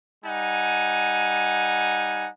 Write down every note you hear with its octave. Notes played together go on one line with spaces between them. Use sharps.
G3 D#4 F#5 G#5